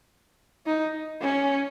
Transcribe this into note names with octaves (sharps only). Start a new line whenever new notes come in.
D#4
C#4